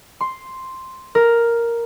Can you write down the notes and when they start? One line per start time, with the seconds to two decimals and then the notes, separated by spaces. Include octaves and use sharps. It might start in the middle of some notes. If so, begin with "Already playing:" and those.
0.21 C6
1.15 A#4